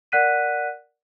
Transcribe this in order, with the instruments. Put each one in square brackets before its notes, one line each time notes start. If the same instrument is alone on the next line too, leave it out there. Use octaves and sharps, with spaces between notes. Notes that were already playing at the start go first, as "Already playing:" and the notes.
[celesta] A#4 D5 F#5 F#6 B6 D#7